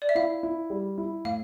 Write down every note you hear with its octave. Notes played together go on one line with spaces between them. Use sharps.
D5
E5
E4 F5
E4
G3
E4
A2 F5